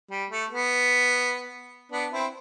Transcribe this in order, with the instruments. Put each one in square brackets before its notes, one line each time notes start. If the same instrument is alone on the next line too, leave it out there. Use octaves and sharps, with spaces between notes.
[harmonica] G3
A3
B3
B3 D4
C4 E4